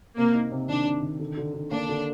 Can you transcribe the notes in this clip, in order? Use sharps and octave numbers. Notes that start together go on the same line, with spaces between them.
C3 A#3
D#4
C3
D#3 D4
C3
D#3
D3
D3
D3
A#3 D4
D3